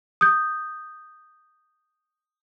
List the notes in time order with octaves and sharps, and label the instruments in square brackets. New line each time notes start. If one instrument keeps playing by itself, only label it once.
[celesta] D#6 G6